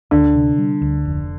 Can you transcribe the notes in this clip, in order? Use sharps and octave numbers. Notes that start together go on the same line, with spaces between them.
D2 D3
C3
G3
D2
F1